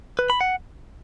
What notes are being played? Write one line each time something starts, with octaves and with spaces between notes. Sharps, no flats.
B4
B5
F#5